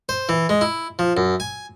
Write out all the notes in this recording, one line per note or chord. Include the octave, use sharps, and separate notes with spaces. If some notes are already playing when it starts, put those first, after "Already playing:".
C5
E3
G#3
E4
F3
F#2
G#5